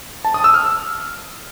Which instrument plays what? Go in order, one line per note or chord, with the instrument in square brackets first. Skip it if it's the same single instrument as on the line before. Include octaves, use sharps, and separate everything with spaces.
[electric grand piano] A5
D#6
E6
F6